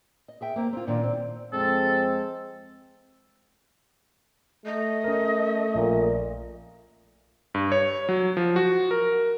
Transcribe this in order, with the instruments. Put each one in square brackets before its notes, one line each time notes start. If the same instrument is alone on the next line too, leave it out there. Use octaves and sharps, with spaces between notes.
[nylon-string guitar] D#5
G#4 E5 G5
A#3 C4
C4 F4
A#2 D#3 D4 F4
C4
[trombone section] F2 G#3 C4 [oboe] A4
[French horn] A3 [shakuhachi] D#5
[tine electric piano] C#4 A#4
[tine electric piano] A#1 [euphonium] A#2
[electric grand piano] G2
C#5
F#3
F3
F#4
A#4